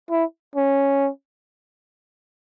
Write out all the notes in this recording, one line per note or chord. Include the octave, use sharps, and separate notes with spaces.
E4
C#4